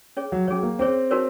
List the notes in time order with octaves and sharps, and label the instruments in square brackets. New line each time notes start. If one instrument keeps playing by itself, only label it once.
[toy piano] C#4 G#4 C#5
[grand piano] F#3
[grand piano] F#3 [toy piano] C#4 G#4 C#5
[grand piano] A#3
[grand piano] C4 [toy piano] C#4 G#4 C#5
[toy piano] D#4 F#4 A#4 C#5